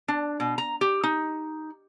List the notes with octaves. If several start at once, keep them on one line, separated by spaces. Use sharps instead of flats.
D4
B2
A#5
G4
D#4